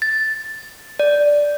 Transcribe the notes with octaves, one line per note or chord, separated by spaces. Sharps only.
A6
D5